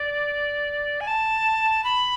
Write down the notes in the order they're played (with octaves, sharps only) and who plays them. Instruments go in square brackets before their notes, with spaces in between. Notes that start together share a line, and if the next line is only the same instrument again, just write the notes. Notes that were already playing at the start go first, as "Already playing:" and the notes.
Already playing: [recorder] D5
G#5
A5
B5